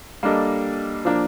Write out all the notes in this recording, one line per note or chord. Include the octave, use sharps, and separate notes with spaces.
G3 A#3 D4 A4 D#5
F3 A#3 D4